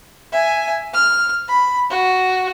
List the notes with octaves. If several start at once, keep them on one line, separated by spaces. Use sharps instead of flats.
E5 G#5
F6
B5
F#4